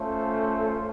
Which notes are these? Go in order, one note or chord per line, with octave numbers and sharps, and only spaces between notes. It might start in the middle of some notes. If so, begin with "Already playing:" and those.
Already playing: A3 C#4 F4 A4 C5